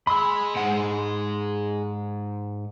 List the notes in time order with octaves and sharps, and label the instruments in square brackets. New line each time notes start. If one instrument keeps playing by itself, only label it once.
[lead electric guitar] G#4 D#5 [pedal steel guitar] B5 C6 E6
[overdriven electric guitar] G#2 F#5